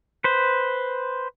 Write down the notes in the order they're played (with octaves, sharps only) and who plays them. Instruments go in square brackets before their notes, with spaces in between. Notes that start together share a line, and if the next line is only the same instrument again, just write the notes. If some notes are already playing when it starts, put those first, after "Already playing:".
[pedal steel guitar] B4 C5